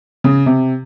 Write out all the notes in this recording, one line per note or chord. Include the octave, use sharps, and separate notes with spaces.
C#3
C3